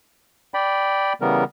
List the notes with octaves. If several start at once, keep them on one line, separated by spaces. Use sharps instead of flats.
D5 G5 B5
C#3 E3 G3 B3 A#4